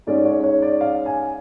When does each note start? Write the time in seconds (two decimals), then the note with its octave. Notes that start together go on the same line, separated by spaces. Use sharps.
0.07 G#2 G#3 C#4 D5
0.25 C#5
0.44 C#5
0.62 D5
0.81 F5
1.06 G#5